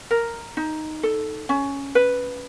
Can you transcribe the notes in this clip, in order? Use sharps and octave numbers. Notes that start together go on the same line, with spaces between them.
A#4
D#4
A4
C#4
B4